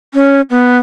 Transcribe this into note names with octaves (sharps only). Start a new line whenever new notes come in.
C#4
B3